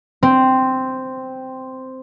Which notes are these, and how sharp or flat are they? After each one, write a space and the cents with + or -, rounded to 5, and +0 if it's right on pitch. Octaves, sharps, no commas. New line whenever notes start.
C4 -5